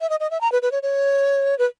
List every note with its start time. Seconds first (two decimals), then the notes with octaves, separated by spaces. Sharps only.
0.01 E5
0.10 D#5
0.20 D#5
0.31 E5
0.41 A#5
0.52 B4
0.62 B4
0.72 C#5
0.83 C#5
1.59 B4